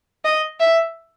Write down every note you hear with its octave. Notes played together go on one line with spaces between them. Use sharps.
D#5
E5